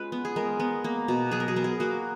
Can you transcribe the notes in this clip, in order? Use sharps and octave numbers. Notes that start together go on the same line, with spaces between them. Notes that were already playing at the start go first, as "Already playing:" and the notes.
Already playing: G#3 C#4 F4 B4
B3
G#4
G#3 A#4
B3
A#3
B2
F#3 G#4
A#4
G#4
B3 A#4
G#4
A#3 F#4